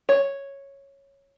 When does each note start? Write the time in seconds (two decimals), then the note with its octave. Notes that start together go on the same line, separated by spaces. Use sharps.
0.09 C#5